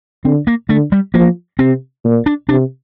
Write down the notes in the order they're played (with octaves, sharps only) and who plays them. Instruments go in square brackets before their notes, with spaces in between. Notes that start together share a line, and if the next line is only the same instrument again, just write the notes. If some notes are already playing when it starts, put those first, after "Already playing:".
[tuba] D3 [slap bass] C4
[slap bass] A#3
[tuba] D3 [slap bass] A3
[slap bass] G3
[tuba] F3 [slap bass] A#3
[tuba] C3 [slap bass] C4
[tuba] A#2
[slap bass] D4
[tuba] C3 [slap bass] D4